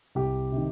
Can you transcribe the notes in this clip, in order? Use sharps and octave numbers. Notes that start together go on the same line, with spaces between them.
C2 G4
C3 D#3